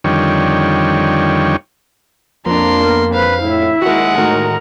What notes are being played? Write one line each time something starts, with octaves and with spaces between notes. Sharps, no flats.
F2 D3 D#3 G3 C#5
F2 A#3 D4 A#5 C6
B3 A#4
B4 C5 F5
A2 E4 E5
D#2 G#3 F#4 A#4 F#5
A2 D#3 F#4 A#4 A#5